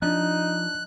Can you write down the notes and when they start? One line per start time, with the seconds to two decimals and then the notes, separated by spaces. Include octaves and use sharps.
0.02 F3 D4 D#4 F#6